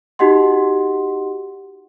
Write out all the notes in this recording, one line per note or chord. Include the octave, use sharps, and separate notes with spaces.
D#4 F#4 G4 D#5 F#5 C6